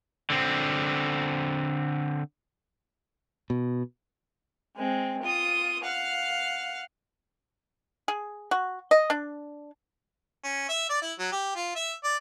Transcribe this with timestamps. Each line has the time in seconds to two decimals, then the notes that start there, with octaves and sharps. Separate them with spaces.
0.30 D3 C4
3.50 B2
4.76 G#3 C4
5.22 F4 D#6
5.84 F5 F#5
8.08 G#4
8.51 F#4
8.91 D#5
9.10 D4
10.44 C#4
10.69 E5
10.90 D5
11.02 E4
11.19 F#3
11.32 G4
11.55 F4
11.75 E5
12.04 D5